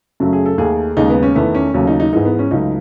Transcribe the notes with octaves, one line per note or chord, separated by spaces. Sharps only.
F#2 C#3 F#3 A3
G#4
A4
D#2 D#3 A3 G#4
D#2 C#3 G#3 D#4
B3
C#4
E2 D#3 A3 B3
C#4
D#2 C#3 F#3 A3 C#4
D#4
D#4
G#2 E3 G#3 D#4
B3
C#4
C#2 C#3 F#3 A3 D#4